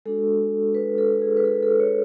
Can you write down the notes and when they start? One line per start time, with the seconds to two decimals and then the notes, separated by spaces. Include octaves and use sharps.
0.05 G#3 D4 F#4 A4
0.75 B4
0.98 A4
1.22 G#4
1.37 B4
1.45 A4
1.63 A4
1.80 C#5